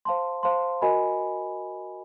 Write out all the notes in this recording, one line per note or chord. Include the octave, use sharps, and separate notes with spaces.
C5 F5 A5 C6
C5 F5 A5 C6
F#4 A#4 D#5 G#5 B5